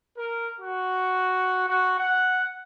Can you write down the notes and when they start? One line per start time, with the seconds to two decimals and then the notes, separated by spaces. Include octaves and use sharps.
0.17 A#4
0.61 F#4
1.67 F#4
1.98 F#5